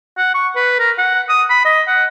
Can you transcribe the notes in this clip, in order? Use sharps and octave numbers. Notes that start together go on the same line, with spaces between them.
F#5
C#6
B4
A#4
F#5
D#6
B5
D#5
F#5